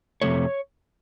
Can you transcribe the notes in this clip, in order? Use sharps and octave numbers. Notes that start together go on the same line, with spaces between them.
F2 C3 F3 A3 C#5